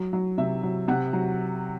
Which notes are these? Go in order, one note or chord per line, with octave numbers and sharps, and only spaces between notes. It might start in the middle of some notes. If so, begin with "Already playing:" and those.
Already playing: F#3
F#3
C3 E5
F#3
C3 F#5
F#3